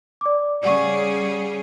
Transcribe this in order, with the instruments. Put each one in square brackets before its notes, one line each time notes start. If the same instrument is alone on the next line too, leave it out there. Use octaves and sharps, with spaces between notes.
[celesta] D5 D6
[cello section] C#3 G3 G#4 [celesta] D5 F#5 C#6